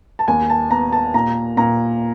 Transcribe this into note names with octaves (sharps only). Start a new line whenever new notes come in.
A5
D#2 G#5
A5
B3 A#5
A5
A#2 A#5
A#2 A#5